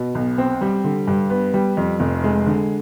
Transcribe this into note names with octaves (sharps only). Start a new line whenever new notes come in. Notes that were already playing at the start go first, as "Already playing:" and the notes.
Already playing: B2
B1
C4
G3
D3
G2
B3
G3
F2
F1
G#3
D3